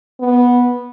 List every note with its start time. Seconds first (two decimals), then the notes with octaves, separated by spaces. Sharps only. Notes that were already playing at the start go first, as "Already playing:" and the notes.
0.20 B3